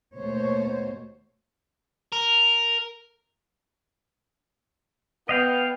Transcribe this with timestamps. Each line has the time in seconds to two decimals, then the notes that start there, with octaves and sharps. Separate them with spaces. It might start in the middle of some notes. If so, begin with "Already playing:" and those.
0.15 D#2 B2 A3 A#3 C5 C#5
2.12 A#4
5.29 B3 D#5 F5 G5